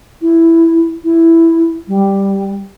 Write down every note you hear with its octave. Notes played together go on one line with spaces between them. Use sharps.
E4
E4
G3